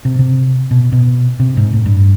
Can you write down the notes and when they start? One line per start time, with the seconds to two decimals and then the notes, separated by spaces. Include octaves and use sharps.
0.05 C3
0.19 C3
0.71 B2
0.92 B2
1.40 C3
1.57 G#2
1.73 A2
1.86 G2